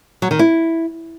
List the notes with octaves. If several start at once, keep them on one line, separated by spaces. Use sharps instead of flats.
F#3
D#3
E4